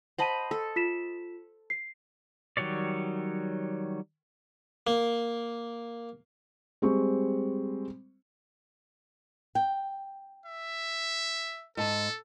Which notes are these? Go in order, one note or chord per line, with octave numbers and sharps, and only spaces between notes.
C5 D#5 F#5 A5 B5 D#7
A4
F4 B6 E7
C7
D#3 F#3 G3 C#5 D5
A#3
G3 G#3 C4 C5 C#6
G5
E5
G#2 A4 A5